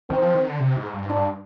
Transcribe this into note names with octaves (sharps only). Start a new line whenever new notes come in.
D#3 C4
F3
D#3
D3
C3
G#2
G2
G#2 D4
G2